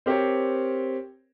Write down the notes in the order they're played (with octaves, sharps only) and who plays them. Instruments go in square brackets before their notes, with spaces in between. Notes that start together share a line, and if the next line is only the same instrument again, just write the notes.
[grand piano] C4 G4 A#4 C5 C#5